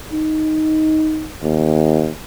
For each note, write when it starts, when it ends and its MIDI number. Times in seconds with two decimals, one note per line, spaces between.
0.12 1.29 63
1.43 2.10 39